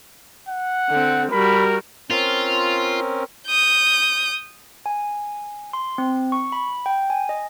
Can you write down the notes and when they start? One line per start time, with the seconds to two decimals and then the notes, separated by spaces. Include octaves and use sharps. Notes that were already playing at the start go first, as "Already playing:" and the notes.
0.49 F#5
0.90 D3 C4
1.32 G3 F#4 A#4 B5
2.11 C4 C#4 F4 A#4
3.47 D#6 G6
4.86 G#5
5.73 C6
5.98 C4
6.32 C#6
6.52 B5
6.86 G5
7.10 G#5
7.29 D#5